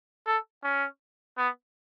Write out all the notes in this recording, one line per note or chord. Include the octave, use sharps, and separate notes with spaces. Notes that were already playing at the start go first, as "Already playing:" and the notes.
A4
C#4
B3